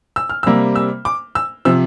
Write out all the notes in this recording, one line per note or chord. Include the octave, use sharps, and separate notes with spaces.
E6
F6
C3 G3 A#3 E6
E6
D6
E6
C3 F3 E6